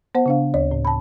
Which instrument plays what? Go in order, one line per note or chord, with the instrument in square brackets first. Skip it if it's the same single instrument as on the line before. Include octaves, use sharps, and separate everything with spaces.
[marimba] B3 C5 F#5
C#3 D4 F5
D2 C#5
A2
A5 B5